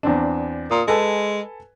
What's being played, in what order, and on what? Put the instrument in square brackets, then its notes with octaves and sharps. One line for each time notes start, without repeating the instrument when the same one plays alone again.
[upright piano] E2 C4 D4
[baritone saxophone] A#2 [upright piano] D#6
[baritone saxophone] G#3 [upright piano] A4 B4 G#5